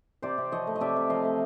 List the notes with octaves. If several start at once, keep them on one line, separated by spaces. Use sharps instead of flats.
C3 C5 D5
C3
F3 C#5 D#5
A3
D#5
C3 D5 E5
C3
F3 D#5 F5
A3